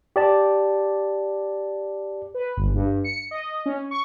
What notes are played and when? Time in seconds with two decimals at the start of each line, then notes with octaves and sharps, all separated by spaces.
0.16 G4 D5 A5
2.34 B4
2.57 G1
2.74 G2
3.04 C#7
3.31 D#5
3.66 C#4
3.91 C#6